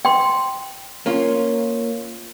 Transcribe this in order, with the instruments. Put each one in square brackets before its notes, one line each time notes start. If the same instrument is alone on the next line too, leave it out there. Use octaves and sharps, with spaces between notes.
[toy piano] G5 C6
[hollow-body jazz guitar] A#3 C#4 F4